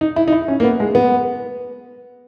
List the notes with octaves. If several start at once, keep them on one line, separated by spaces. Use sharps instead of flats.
D#4
E4
D#4
E4
C#4
A#3
B3
G#3
B3